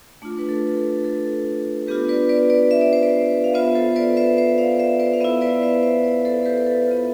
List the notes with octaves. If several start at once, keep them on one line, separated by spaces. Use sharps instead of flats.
A3 D4 F4
B4
A4
A4
A4
B3 D4 F4 G4 B4
B4 D5
B4 D5
B4 D5
E5
D5
C5
B4 D5
F5
B3 F4 C5 E5
A4 C5
B4 D5
C5 E5
C5 E5
D5 F5
C5 E5
B4 D5
F5
B3 E4 C5 E5
B4 D5
C5 E5
C5 E5
B4 D5
A4 C5
G4 B4
B4
A4
B3 F4